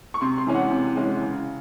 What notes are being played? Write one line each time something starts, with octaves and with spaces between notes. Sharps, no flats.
C#6
C3 C6
C6
E3 G#3 C#4
F#5
C3
E3 G#3 C#4
C#3